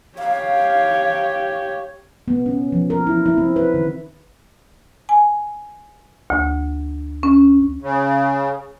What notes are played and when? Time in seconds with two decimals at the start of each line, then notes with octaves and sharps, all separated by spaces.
0.18 G4 C#5 F5
2.28 B3
2.46 C#4
2.72 F3
2.90 A#4
3.07 E4
3.26 E4
3.38 C4
3.56 B4
3.74 D#3
5.09 G#5
6.30 D2
7.23 C#4
7.82 C#3